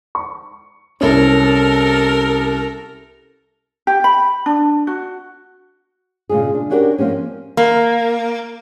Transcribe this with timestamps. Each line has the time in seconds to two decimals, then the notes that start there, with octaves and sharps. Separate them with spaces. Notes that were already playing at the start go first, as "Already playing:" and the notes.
0.15 C#6
1.01 C2 C#4 A4 A#4
3.87 G4
4.04 B5
4.46 D4
4.87 F#4
6.29 A#2 C#3 G#3 F4 G#4
6.55 D4
6.70 C#4 D4 F#4 G4 A#4
6.98 F3 A#3 C4 C#4
7.57 A#3